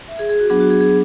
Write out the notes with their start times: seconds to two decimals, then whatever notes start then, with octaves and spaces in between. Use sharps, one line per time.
0.08 E5
0.19 G#4
0.29 G#4
0.40 F#4
0.50 F#3 B3 D4 G#4
0.60 F#4
0.70 G#4
0.81 G#4